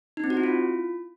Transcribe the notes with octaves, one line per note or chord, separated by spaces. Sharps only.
D#4
C4
F#4
E4
F4